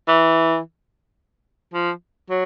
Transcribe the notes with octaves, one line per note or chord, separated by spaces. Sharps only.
E3
F3
F#3